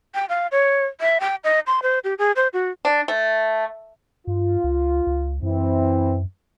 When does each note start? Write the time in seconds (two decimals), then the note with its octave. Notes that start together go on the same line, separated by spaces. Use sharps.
0.15 G5
0.29 F5
0.52 C#5
1.01 E5
1.20 G5
1.44 D#5
1.67 C6
1.83 C5
2.04 G4
2.19 G#4
2.36 C5
2.53 F#4
2.85 D4
3.08 A3
4.27 G2 F4
4.64 C#2
5.07 C#2
5.43 F#2 E3 C4 E4